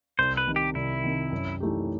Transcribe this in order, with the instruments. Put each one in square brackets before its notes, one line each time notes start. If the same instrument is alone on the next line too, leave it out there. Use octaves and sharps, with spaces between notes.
[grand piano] C2 [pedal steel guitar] C5
[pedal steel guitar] B4
[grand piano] C3 D#3
[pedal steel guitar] G4
[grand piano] C2 [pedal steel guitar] E4
[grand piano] C3 D#3
F#2
E3 A3 D#4 G4